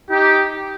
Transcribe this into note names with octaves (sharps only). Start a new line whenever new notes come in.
D#4 G4